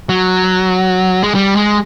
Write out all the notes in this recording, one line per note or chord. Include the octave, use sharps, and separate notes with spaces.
F#3
G#3
G3
G#3